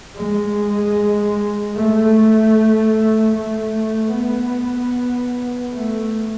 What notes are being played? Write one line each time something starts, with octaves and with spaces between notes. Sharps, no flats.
G#3
A3
A3
B3
A3